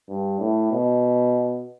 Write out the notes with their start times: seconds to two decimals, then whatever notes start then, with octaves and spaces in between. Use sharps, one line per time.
0.09 G2
0.40 A2
0.72 B2